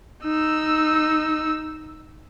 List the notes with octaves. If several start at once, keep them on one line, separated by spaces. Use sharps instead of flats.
D#4 E6